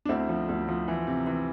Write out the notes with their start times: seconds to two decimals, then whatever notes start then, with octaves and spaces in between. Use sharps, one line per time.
0.05 D4
0.09 D2 C4 E4
0.29 F3
0.49 D2
0.69 F3
0.88 E3
1.07 C3
1.27 E3